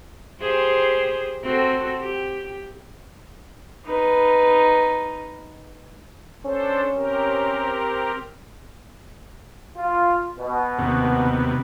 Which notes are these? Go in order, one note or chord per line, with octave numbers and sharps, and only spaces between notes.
G4 G#4 C5
C4 F#4 A4
G4
D#4 B4
C#4 D4 A4 C5
C4 G4 A#4
F4
B2
D#2 C3 B3